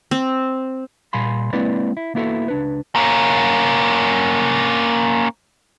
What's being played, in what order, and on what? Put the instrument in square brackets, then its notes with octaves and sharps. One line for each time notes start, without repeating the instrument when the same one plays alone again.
[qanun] C4
[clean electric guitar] A#2 G3 F5 G#5 B5 C6
G#3 A#3 C4 E4 B4 D5
E4
A#3 B3 E4 F#4 A4
C#2 D4 B4
[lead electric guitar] A#3 C#4